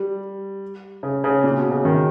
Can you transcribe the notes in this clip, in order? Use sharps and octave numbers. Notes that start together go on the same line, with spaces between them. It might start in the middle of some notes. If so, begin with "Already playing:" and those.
Already playing: G3
C#3
C#3
A#2
B2
C#3
D#3